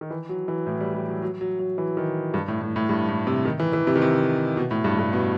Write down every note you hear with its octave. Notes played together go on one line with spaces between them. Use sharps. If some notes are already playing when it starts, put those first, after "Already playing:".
D#3
E3
F#3
E3
A2
G3
G3
F#3
F#3
F#3
F#3
E3
D#3
G2
A2
A2
A2
G2
A2
C3
D#3
E3
E3
C3
D#3
C3
B2
A2
G2
G2
B2